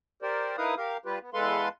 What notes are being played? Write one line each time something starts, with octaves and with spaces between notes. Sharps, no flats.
G4 A#4 C5 D5
D#4 E4 A#4 B4 F5 D#6
G4 A#4 F5
G3 F4 G4 B4
B3
E2 G#3 A4 B4 F5 C6